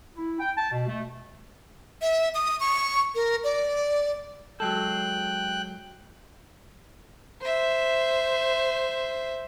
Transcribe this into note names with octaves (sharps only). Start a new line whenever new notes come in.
E4
G5
A5
B2
A3
E5
D#6
C#6
A#4
D5
F#3 G#3 A4 G5 F#6
C5 E5